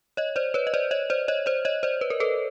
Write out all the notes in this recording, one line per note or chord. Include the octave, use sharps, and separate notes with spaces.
C#5 D#5
C5 D5
B4 C#5
D#5
C5 D5
C#5 D#5
C5 D5
C#5 D#5
C5 D5
C#5 D#5
C5 D5
B4
A#4
A4 B4